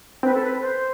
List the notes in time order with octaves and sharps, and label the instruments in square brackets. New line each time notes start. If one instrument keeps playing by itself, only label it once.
[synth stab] C4 [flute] B4
[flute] A4
B4
C5